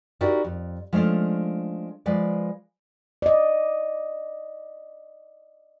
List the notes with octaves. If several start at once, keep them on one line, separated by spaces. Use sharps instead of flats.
D#4 E4 F#4 G4 A#4 D5
F2
F3 G#3 A3 C#4 D4 F5
F3 G#3 B4 D5
D5 D#5